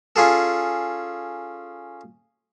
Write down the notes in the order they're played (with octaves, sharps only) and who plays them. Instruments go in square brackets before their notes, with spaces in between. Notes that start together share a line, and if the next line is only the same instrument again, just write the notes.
[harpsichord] C#4 F4 G#4 A4